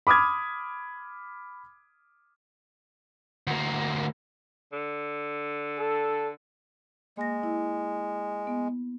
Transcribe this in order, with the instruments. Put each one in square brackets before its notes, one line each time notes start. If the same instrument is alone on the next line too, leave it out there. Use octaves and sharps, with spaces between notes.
[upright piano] B5 D6 D#6 F6 G#6
[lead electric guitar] D2 A#3
[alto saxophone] D3
[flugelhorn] A4
[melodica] G#3 [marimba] A#3 A#6
[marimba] E4
B3